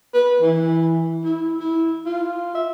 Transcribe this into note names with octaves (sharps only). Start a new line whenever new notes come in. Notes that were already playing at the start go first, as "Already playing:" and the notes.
B4
E3
E4
E4
F4
E5